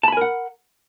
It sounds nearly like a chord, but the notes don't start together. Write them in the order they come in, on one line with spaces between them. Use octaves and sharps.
A5 B5 G#5 A#4 F#5